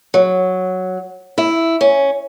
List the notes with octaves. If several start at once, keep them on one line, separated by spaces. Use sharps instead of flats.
F#3
E4
C#4